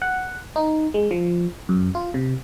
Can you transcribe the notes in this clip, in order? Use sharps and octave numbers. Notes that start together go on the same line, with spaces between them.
F#5
D#4
G#3
F3
F#2
F4
C3